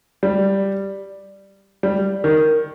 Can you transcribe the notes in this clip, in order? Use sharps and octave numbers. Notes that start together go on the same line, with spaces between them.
G3
G3
D#3